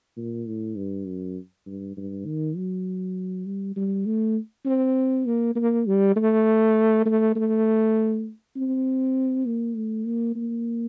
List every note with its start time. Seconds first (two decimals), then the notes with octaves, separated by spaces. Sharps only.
0.17 A#2
0.46 A2
0.76 G2
1.06 F#2
1.66 G2
1.97 G2
2.26 D#3
2.56 F#3
3.46 G3
3.76 G3
4.06 A3
4.66 C4
5.26 A#3
5.55 A#3
5.86 G3
6.16 A3
7.05 A3
7.36 A3
8.56 C4
9.46 A#3
9.76 A3
10.06 A#3
10.36 A#3